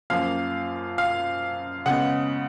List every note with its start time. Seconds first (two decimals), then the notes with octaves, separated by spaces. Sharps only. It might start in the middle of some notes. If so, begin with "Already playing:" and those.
0.10 F#2 F3 A#3 F5
0.98 F5
1.86 C#3 G#3 B3 F#5